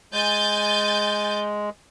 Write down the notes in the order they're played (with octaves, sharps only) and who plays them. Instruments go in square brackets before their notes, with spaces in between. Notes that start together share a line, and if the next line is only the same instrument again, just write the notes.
[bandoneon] G#3 [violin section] G#5 G6 A6